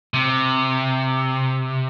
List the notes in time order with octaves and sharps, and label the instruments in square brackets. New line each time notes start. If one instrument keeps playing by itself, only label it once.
[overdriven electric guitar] C3